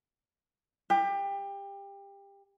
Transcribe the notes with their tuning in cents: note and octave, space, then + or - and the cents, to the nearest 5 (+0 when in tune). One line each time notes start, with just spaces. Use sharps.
G4 +25